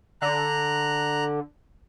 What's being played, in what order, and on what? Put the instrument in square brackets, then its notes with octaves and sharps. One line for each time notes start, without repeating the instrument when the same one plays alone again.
[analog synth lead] D3 [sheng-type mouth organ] A#5 F#6